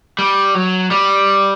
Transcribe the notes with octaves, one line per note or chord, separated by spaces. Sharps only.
G3
F#3
G3